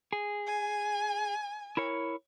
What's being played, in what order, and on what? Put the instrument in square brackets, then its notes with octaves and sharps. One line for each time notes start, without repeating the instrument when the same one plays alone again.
[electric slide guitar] G#4
[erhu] G#5
[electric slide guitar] E4 A#4 C#5